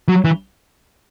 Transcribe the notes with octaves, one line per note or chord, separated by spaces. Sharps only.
F#3
E3